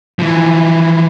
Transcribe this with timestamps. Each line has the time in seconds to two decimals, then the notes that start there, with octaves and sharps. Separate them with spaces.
0.19 E3 F3